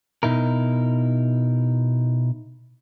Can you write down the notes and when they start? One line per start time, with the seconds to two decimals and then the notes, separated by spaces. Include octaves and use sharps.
0.23 B2 D#4 E4 A#4